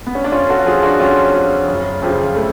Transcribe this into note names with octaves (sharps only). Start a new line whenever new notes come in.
B3
C#4
D4
F2 C#4 F4
F#4 A4
F3 F4 G#4
D4 F#4
F2 C#4 F4
F3
F#1
F2 C#3 F3
A3